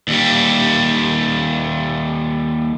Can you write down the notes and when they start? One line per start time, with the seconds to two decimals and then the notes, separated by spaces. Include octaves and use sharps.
0.08 D#2 G3